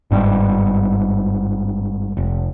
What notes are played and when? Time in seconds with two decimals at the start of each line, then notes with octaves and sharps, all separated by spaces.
0.11 G1 G#2 B2 G3
2.17 F1